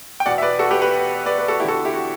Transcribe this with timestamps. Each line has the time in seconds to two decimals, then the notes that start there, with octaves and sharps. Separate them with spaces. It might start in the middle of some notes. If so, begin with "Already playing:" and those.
0.20 G5
0.26 E2 B2 D5 F#5
0.38 E5
0.42 B4 D5
0.59 F#4 A4
0.71 G4 B4
0.82 G4 B4
1.26 B4 D5
1.38 B4
1.48 F#4 A4
1.60 E2 E4 G4
1.64 D3 F#4 A4
1.85 E4 G4
1.94 F#4